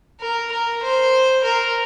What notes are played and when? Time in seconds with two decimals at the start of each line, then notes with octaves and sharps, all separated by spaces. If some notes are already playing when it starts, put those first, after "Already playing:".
0.21 A#4
0.52 A#4
0.83 C5
1.44 A#4